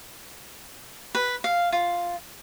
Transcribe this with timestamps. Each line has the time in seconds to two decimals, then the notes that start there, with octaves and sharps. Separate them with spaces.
1.15 B4
1.44 F5
1.72 F4